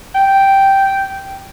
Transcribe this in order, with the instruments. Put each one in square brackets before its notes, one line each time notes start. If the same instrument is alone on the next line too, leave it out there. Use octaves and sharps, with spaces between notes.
[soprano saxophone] G5